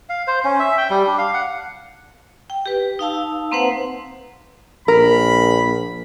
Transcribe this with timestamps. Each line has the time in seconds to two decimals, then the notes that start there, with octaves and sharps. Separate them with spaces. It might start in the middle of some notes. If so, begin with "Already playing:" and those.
0.09 F5
0.27 C5
0.44 C#4
0.59 E5
0.77 G5
0.90 G3
1.07 D4
1.18 F5
1.34 F#5
2.50 G5
2.66 G4 B4
2.99 D#4 F5 A5 E6
3.51 A#3 C4 B4 C5 F#5
4.88 A#1 A#4 B5